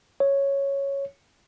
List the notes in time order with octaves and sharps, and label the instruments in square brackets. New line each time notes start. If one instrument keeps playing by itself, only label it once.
[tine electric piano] C#5